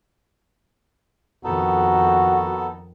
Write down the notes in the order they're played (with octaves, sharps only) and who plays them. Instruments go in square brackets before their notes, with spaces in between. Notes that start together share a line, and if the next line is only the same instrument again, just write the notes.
[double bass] F2 D#3 [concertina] B3 D#4 A4 [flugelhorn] F#4